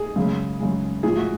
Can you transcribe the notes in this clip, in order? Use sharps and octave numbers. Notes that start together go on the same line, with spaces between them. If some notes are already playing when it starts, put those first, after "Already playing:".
Already playing: G#4
F#2 C#3 G#3
F#2 C#3 G#3
A2 F3 G#3 G#4
F#4